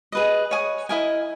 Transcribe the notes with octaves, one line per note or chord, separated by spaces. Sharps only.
G#4 B4 D#5
C#5 G#5 D#6
E4 A#4 D#5 G#5